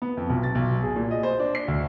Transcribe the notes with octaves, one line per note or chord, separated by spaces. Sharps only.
B3
F2
B1
A6
B1
G#4
A#2
D#5
C5
D4
C7
D2